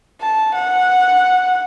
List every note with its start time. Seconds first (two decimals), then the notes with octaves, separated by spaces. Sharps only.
0.22 A5
0.55 F#5